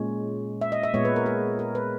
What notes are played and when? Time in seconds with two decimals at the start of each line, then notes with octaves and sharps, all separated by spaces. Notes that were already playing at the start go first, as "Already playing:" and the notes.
Already playing: A#2 G#3 C#4
0.61 E5
0.72 D#5
0.83 E5
0.94 A#2 G#3 B3 C#5
1.05 B4
1.16 A#4
1.26 G#4
1.59 A#4
1.75 B4